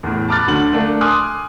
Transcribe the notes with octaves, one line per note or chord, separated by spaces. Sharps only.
E2 A2
A5 B5 D6 F6 F#6 A6
D2 D3 F#3 F#7
A3 A#3 D4
G#5 C6 D6 D#6 F6 F#6